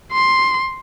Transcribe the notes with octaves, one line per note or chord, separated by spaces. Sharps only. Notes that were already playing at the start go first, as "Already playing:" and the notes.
C6